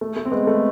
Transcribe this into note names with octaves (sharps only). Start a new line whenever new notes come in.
A3
A3
C4
G#3 B3
A3